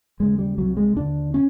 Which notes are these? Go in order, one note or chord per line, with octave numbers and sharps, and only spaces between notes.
D#2 C#3 G#3
G3
C2 C3 F#3
G#3
D#2 D3 D4
C#4